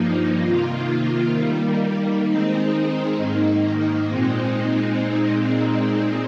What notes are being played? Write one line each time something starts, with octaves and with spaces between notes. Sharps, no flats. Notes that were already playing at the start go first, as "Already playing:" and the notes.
Already playing: G2 F3 A#3 D#4
C3 D#3 A#3 F4
D#3 G3 A#3
D#3 G#3 C4 D#4
G#2 D#3 A#3 D#4
A#2 G#3 C4 D#4